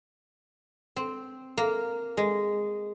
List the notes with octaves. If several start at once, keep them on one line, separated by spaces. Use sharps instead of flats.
C4
A#3
G#3